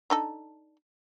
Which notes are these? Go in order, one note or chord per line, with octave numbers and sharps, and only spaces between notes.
D4 D#4 A4